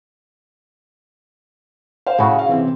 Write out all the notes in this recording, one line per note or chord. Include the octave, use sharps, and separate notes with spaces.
C5 F5
A2 C#3 F#4
G#4 F5
C3 E3 C4